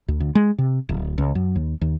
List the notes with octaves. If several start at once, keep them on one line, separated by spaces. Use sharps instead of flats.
D2
D2
G#3
C3
D1
C#2
F#2
D#2
D#2